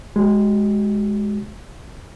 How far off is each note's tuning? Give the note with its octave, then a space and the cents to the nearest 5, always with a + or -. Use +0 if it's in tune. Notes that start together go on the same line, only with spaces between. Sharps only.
G#3 +0 F#4 +35